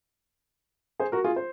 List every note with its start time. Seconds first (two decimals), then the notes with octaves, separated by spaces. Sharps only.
1.00 G#4 C5
1.12 F#4 A#4
1.24 F4 G#4
1.36 C5